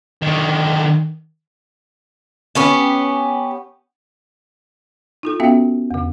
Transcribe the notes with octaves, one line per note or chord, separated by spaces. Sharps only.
D3 D#3
B3 C#4 G4
D#4 F4 A4
B3 C#4 F#4 E5 F5 G5
E2 C#3